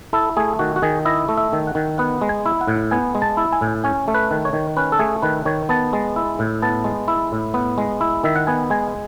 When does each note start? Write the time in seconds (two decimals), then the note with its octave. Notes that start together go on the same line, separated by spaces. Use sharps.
0.13 E4 A4
0.37 A3 G#4
0.59 D#3 F#4
0.76 F#4
0.82 D#3 G#4
1.05 E4 D#5
1.29 A3
1.37 E5
1.53 D#3
1.67 F#5
1.75 D#3
1.98 B3 F#5
2.22 G#3
2.29 G#5
2.46 E4
2.61 F#5
2.67 A2
2.91 B3 G#5
3.15 G#3
3.22 A5
3.37 E4
3.52 G#5
3.61 A2
3.84 C#4 G#5
4.08 A3
4.14 B4
4.31 D#3
4.45 C#5
4.53 D#3
4.77 C#4 B4
4.92 A4
4.99 A3 G#4
5.22 D#3 B4
5.45 D#3 C#5
5.69 B3 A5
5.93 G#3
6.16 E4
6.39 A2
6.62 B3 A5
6.84 G#3
7.08 E4
7.32 A2
7.54 B3
7.78 G#3
8.01 E4
8.24 D#3 E5
8.36 F#5
8.47 B3 G#5
8.70 G#3 G#5